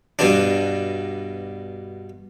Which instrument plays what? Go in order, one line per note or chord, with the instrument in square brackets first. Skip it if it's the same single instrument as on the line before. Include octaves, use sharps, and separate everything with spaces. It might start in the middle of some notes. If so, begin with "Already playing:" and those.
[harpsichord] G2 B2 D4